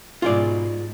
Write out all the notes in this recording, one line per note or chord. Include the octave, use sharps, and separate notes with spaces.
G#2 B2 F4 G#4 D5